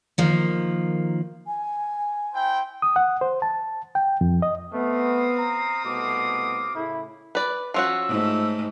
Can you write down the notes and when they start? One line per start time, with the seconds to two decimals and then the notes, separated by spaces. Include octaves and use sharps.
0.18 D#3 F3 A#3
1.47 G#5
2.33 E4 C5 G5
2.82 D#6
2.96 F#5
3.21 C5
3.42 A5
3.95 G5
4.21 F2
4.42 D#5
4.73 A3 B3 C4 F5 D#6
5.38 A#5
5.85 C2 B2 A3 D6
6.75 A2 C#3 E4
7.35 B4 D5
7.74 F3 C#4 F#4 E6
8.08 G#2 A3